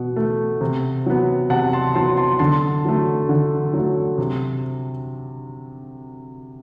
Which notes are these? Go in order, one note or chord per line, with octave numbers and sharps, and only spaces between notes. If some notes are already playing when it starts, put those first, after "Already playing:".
Already playing: B2 F#5
A3
C3
F#3 B3
C3 F#5 A5
A5 C6
F#3 B3 A5 C6
A5 C6
D3 A5 C6
F#3 A3
D3
F#3 A3
C3